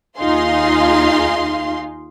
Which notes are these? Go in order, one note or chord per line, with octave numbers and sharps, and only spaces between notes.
D#2 D#4 F4 G#4 F5 C6